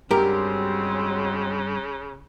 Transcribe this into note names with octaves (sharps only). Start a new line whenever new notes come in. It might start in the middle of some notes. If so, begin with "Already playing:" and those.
G2 C#3 F#3 G#3 C4 G4 A#4